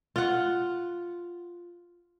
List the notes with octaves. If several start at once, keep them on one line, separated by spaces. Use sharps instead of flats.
F4 F#5